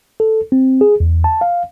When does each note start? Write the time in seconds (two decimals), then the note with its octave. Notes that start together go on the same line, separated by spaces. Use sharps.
0.20 A4
0.52 C4
0.81 G#4
1.00 E2
1.24 A5
1.41 F5